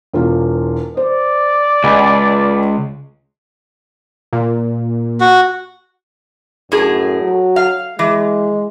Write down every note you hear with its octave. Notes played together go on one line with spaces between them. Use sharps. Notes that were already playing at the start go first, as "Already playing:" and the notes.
E1 E2 F4
C5 D5
C#2 D#5 G#5 B5
A#2
F#4
F#2 A2 G#4
F#3
F5
E3 G#3